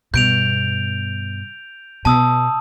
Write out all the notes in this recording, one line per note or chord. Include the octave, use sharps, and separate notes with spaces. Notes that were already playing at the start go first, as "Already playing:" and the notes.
G2 B2 G6 D7 F7
B2 A5 D#6 E6